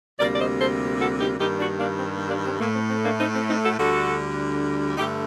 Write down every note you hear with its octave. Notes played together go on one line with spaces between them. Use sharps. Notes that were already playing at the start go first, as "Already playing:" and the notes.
D2 C3 G3 A#3 A#4 D5
D5
C5 D#5
A4 C5
F#4 A4
D#4 G4
G2 D#3 G3 A#3 D#4 G4
D4 F#4
A#3 D4
C4
A#3
A#3 D4
C4
A2 A3 A#3
C4
C4
A#3 D4
C4 D#4
C4
C4 D#4
F#4 A4
D2 D3 G3 F#4 A4
G2 D3 A3 D#4 G4